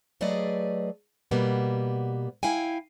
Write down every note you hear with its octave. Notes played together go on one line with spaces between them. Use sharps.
F#3 A3 G#4 B4 D5 D#5
B2 G3 A#3 B3
E4 F5 G5 G#5